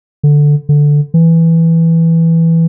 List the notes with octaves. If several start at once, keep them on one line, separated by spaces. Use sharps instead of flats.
D3
D3
E3